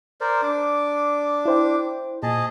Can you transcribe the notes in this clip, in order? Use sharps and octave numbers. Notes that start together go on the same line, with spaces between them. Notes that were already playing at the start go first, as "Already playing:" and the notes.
A#4 C5 D5
D4 D6
E4 C5 G5
A#2 G#4 D#5 A5